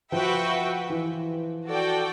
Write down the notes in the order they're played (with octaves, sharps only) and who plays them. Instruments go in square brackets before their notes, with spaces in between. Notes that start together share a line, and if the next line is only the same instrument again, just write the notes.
[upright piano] F3 [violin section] F#4 B4 E5 G5
[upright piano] E3
[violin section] F#4 A4 D5 G5